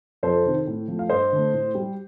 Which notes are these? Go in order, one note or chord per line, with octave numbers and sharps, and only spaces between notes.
F2 A4 C5
C3 D#3
A2
F3 A3
F5
G2 C5 D#5
D3 A3
A2
G3